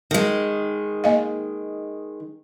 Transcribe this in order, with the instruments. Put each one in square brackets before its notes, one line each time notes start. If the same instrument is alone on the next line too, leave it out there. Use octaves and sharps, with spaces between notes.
[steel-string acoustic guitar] D#3 G#3
[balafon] A#3 D#5 F5